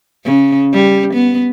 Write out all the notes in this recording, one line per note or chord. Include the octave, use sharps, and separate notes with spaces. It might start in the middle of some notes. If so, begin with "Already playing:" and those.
C#3
G3
B3